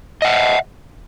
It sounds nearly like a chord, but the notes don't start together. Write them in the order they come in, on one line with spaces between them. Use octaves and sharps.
D#5 F#5 E5